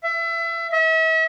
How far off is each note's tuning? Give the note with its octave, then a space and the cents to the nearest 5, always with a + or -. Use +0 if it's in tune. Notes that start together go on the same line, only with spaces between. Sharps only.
E5 +25
E5 -40